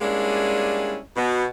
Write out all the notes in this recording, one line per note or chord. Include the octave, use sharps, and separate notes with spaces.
G3 G#3 A#3 C#4 D4 E4
B2